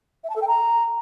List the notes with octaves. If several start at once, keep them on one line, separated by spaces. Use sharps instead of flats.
E5
A5
A4
G5
A#5